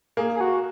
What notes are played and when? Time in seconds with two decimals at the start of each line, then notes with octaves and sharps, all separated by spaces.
0.17 A#3 G#4
0.35 G#4
0.41 F#4